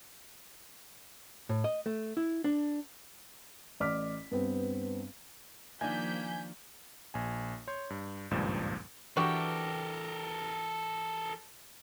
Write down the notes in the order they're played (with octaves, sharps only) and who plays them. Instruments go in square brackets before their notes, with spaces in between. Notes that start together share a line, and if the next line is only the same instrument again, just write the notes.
[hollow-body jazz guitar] A2
D#5
A3
E4
D4
[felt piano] A1 D5 D6 F6 B6
G2 B3 C4
[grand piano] D#3 D4 F4 [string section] F3 G6 B6 [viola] A#3 [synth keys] G#5
[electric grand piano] A#1 G#5
C#5 C6 G6
G2
G#1 C#2 G2 A#2 F3 E7
[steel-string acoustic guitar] E3 G5 [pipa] D4 F#4 G4 [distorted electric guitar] A4 A#4